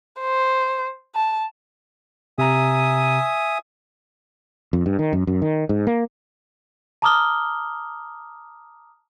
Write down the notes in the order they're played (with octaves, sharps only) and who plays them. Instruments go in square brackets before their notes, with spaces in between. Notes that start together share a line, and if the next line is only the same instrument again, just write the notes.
[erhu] C5
A5
[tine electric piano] C3 A#5 [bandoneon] E5 G#5 D#6
[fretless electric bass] F2
G2
D#3
F#2
F#2
D#3
G#2
A#3
[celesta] A5 A#5 D6 D#6 F6 G7